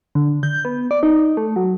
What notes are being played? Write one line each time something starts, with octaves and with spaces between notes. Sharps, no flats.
D3
G6
B3
D5
D#4
A3
F#3